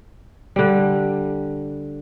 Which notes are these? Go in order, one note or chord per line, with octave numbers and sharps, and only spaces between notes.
D3 G3